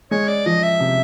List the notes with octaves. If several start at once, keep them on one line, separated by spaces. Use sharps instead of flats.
G#3 C#5
D5
F3 D#5
E5
C3